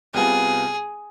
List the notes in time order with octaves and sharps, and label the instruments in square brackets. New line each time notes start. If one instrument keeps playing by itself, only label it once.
[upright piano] C2 C3 G3 B3 F4 [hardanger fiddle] G#4